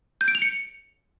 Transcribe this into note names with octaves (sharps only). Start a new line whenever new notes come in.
G6
D7
F7
C#7